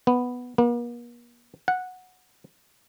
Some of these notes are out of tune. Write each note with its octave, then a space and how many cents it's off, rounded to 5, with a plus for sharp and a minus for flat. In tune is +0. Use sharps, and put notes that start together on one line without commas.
B3 +0
A#3 +45
F#5 -10